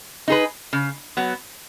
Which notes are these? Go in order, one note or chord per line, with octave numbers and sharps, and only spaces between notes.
D#4 G#4 B4
C#3
F#3 B3